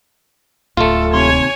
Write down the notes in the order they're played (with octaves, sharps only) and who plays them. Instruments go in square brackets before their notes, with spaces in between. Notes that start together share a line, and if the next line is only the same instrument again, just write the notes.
[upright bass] D1 [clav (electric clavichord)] A3 F4 [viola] A4
[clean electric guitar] D#2 C3 C6 [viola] C#5 G#5